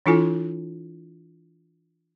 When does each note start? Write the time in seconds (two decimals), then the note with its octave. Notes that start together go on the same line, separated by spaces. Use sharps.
0.06 E3 D4 E4 F4 A4 G#5